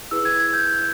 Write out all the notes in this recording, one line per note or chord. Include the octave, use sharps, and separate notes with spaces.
E4 G#4 B4 E6
G#6
G#6
G6
G6